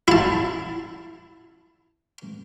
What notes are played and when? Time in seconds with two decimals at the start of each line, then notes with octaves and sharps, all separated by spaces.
0.08 E4 A5